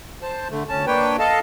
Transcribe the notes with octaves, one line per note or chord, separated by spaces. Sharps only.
C5 A5
D3 A3
D2 C#4 A5
A#3 D4 B4 C#5 G5
A4 D#5 F5 A5